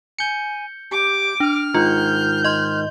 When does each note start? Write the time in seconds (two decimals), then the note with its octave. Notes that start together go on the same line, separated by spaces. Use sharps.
0.19 G#5 G6 C#7
0.91 G4 D6
1.40 D4 F6
1.74 G#2 D#3 F4 G6
2.44 D#5 C6 F6